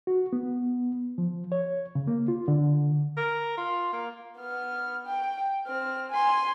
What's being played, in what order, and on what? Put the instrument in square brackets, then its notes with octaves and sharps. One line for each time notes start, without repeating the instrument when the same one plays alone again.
[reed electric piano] F#4
B3
F3
C#5
C#3
A#3
F4
D3
[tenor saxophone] A#4
F4
A#3
[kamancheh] B3 F6
G5
C4 F6
G#5 C6